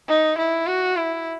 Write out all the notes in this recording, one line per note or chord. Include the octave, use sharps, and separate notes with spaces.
D#4
E4
F#4
E4